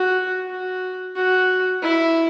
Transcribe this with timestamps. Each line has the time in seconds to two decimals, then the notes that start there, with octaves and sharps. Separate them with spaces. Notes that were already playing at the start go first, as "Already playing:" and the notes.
Already playing: F#4
0.49 F#4
1.16 F#4
1.82 E4